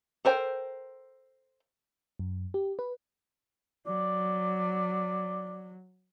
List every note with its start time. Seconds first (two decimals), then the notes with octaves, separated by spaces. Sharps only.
0.25 A4 A#4 C5 G5
2.19 F#2
2.54 G4
2.79 B4
3.87 F#3 D5